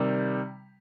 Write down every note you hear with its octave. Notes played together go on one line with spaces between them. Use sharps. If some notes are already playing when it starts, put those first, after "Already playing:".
Already playing: C3 D#3 G3